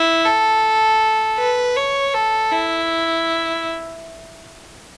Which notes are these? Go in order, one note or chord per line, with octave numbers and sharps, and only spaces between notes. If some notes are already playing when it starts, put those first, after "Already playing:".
Already playing: E4
A4
B4
C#5
A4
E4